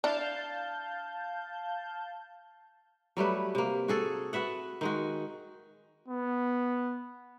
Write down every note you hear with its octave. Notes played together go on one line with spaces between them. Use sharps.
D4 E4 F5 A5 G6
F#3 G3 A3 B4
C3 A#3
F#4 G#4 A4
F#4 B4 E5 F#5
D#3 G#3 F#4
B3